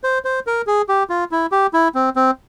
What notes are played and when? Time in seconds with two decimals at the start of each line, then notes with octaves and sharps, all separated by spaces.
0.04 C5
0.25 C5
0.47 A#4
0.67 G#4
0.89 G4
1.10 F4
1.31 E4
1.52 G4
1.73 E4
1.95 C4
2.16 C4